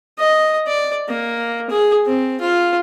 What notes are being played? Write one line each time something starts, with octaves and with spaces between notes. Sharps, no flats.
D#5
D5
A#3
G#4
C4
F4